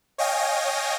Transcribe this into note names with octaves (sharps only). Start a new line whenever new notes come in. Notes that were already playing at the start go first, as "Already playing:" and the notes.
C#5 D#5 F5 G5 G#5 A#6